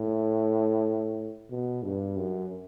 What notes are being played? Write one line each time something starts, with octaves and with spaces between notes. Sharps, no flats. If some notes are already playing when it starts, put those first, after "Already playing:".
Already playing: A2
B2
G2
F#2